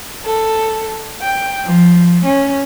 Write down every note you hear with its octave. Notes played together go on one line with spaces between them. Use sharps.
A4
G5
F3
C#4